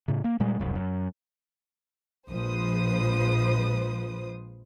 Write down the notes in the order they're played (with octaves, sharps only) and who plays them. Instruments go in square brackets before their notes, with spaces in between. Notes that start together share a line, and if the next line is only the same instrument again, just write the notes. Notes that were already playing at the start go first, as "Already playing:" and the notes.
[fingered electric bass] A2 C#3
A#3
A#2 G3 G#3
E1 C2 F#2
F#2
[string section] A#1 F3 G#3 B4 C5 D#6